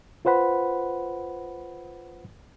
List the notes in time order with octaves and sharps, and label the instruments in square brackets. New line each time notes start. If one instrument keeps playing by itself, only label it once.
[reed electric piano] F4 B4 C5 F#5 B5